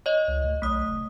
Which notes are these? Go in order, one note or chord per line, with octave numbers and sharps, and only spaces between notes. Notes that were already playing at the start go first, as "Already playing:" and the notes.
C#5 D#5
C#2
D2
B1 A3 D#6
F1